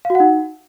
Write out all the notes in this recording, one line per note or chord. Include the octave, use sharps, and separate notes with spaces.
F5
F#4
F#5
D#4